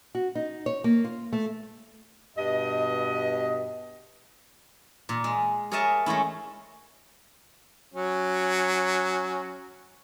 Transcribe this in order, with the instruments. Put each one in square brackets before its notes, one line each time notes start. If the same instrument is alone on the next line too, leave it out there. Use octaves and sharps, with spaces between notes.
[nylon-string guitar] F#4
D#4
C#5
A#3
F4
A3
[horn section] G2 B2 D#5
[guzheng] A#2
G#3
G#4 A#4 C#5 D#5 E5 A5
G#3 A3 C#4 E4
[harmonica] F#3 C#4